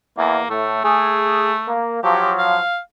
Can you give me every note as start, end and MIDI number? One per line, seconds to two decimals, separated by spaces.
0.18 0.42 40
0.18 0.42 52
0.18 0.48 58
0.50 0.80 45
0.50 0.80 57
0.84 1.77 57
0.84 1.51 68
1.68 2.03 58
2.03 2.59 53
2.03 2.59 54
2.03 2.32 67
2.39 2.79 77